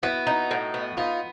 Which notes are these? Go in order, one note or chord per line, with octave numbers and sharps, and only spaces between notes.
B3 E4 F#4
D#4
A2
B3
B3 D#4 F4